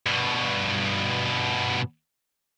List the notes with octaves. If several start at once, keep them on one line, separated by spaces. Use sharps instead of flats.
G2 B2